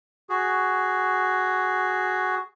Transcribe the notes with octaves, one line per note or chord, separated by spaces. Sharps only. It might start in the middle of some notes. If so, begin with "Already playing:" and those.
F#4 G#4